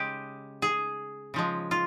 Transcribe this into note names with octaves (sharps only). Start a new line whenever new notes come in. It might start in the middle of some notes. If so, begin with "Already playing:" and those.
Already playing: C#3 G#3 G4
G#4
C#3 F3 G#3
F4